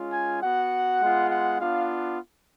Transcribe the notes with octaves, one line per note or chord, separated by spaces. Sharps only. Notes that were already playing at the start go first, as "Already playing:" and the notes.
Already playing: G#3 C#4 F4
G#5
B3 F#4 F#5
G#3 B3 F4
F#5
B3 D4 F4 F5